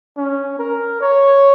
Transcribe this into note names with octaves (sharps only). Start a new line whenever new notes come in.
C#4
A#4
C#5